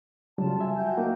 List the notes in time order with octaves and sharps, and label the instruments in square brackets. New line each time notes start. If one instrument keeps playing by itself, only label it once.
[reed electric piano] C#3 F#3 G3 [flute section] F4 A5
[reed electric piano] E5 G#5
[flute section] F#4 G5 G6
[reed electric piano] A#3 D#4